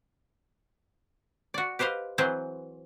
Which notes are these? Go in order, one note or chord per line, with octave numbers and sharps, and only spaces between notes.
F#4 D5
G4 B4 C5 D#5 F5
E3 F#3 C4 G#4 B4 C5